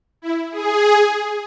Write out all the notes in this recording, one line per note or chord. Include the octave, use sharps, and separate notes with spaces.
E4
G#4